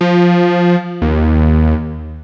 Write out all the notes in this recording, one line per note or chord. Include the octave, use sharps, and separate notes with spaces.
F3
D#2